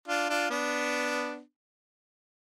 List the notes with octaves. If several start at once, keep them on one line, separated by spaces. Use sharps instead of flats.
D4 F4
D4 F4
B3 D4